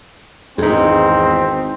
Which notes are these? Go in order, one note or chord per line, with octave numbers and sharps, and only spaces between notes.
G#1 E2 G#2 G#3 C4 D#4